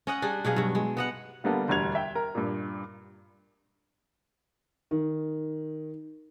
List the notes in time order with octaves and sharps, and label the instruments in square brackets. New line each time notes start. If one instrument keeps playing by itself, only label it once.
[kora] C#4 D#5 F#5
G3 D4 G#4
B2 F#3 G#4 F5
G2 F#3
G#3
B3 D#5 F#5
[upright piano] D3 G3 A#3 B3 A4
E1 D2 G3 G#6 F7
E5 G5
A#4
G2 A#2
D#3